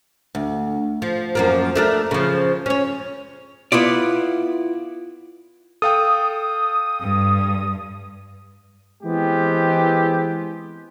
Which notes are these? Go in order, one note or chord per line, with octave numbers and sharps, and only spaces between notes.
D2
F3
F#2 F3 A#3
A3 D4 A#4
C#3 F3
C#4 C#5
B3 E4 F4 D5
A4 F5 G5 D#6
G2
E3 G#3 B3 C4 G4